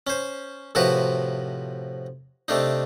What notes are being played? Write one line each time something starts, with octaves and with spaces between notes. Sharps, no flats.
C#4 C5
A2 C3 F3 F#4 A#4 B4
C3 A3 D4 D#4